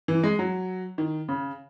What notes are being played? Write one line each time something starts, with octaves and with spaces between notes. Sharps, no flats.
E3
G#3
F#3
D#3
C#3